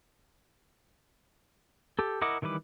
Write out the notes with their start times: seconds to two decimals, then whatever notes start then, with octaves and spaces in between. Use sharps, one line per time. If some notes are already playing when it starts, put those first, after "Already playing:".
1.99 G4 A4
2.22 E4 A#4 D#5 F#5 D6
2.42 D#3 E3 G3 B4 D6